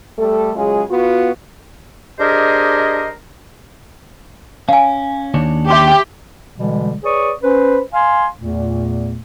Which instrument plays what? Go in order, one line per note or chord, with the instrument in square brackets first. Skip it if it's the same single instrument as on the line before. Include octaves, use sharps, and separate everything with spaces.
[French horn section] G3 A3 A4
C#3 F#3 G#3 F4 G#4
B3 F4 F#4
[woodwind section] D4 G4 G#4 A#4 C5 D#5
[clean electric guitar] C#4 [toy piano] F5 G#5
[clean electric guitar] D#2 D4 C#5
[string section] G4 [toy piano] E5 C6 D6
[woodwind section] B2 D3 E3 G3 G#3
G#4 B4 C#5 D5 C#6 D#6
C#4 B4 C5
F5 G#5 C6
E2 A#2 A3